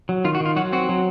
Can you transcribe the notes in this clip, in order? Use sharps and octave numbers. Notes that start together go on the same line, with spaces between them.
F#3
D#3 F4
F#4
D#3
F4
F#3 F#4
C4 F#4
F#3